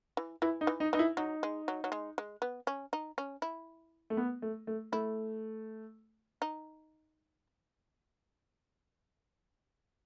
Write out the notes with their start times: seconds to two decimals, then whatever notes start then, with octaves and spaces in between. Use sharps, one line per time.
0.17 E3
0.42 E3 E4
0.61 D#4
0.67 E3
0.80 D#4
0.93 E3 D#4
0.99 E4
1.17 F#3 D#4
1.43 G#3
1.68 F#3
1.84 F#3
1.92 G#3
2.18 G#3
2.42 B3
2.67 C#4
2.93 D#4
3.18 C#4
3.42 E4
4.10 A3
4.17 B3
4.42 A3
4.67 A3
4.92 A3 E4
6.42 D#4